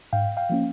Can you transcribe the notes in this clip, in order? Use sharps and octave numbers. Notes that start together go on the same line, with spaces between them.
G#2 F5 G5
F5 G5
F3 A#3 C#4